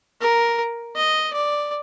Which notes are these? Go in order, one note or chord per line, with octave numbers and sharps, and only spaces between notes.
A#4
D#5
D5